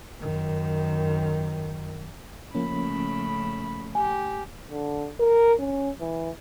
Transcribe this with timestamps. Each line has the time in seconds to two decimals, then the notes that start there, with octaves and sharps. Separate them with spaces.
0.20 F#2 D#3
2.55 C#3 F3 A3 A#3 C#4 B5
3.95 G4 G#5
4.70 D3
5.20 A#4
5.59 C#4
6.01 E3